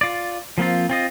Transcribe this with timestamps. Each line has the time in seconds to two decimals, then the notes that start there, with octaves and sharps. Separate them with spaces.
0.01 F4 D5
0.58 F3 A#3 C4 F4
0.89 C4 F4 D#5